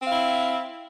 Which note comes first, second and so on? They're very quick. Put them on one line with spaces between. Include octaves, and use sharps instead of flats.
C4 F5 E4